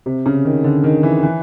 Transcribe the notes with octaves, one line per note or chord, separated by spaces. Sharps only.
C3
C#3
D#3
D3
D#3
E3
E3